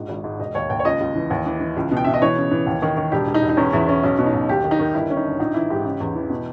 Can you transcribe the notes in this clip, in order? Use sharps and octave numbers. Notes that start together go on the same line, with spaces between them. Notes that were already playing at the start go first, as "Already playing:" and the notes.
Already playing: A#1 G#2
G#1
G#2
E1 D#5
D#2 C#5
D#2 G5
C#5
C#2 D#5
C#2
E3
D#2
E3
E3
C#2
B2
G5
B2 E5
D#5
E3 C#5
C#3
E3
D#2
D#3
D#3
E1 G4
E1
D#4
E1
D#4
E2 C#4
E2 E4
E2 C#4
B1 C#4
B2
D#4
B1
D#2 G4
D#3
D#4
D#3
G1 E4
G1 C#4
D#4
G1
A#1 D#4
E3 E4
G#2 G4
C#3
E2
E3
B2